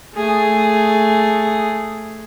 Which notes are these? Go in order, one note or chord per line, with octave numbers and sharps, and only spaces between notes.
A3 G#4